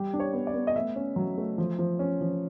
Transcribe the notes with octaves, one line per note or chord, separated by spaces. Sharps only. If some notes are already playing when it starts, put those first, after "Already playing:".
Already playing: G3 G4
D4
C#5
B3
D5
B3
D#5
A3 E5
C#4
F#3
A3
F3
F3
C#4
F3